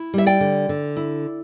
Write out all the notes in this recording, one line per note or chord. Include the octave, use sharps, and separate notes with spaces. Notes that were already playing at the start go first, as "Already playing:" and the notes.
Already playing: E4
G3 E5
D5 G5
D3
D3
E4